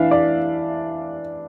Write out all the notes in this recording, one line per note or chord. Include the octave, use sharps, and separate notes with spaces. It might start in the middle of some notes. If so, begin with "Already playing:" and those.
Already playing: E3 D4 E5 F5
D5